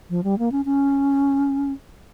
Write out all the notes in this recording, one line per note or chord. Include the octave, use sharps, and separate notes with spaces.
F3
G3
A#3
C#4
C#4